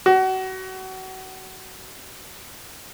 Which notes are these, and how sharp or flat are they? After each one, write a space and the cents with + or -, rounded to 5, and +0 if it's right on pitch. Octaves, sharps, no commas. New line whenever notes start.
F#4 +30